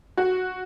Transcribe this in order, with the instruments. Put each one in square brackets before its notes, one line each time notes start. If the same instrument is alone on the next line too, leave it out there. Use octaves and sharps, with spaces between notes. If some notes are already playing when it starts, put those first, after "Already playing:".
[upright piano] F#4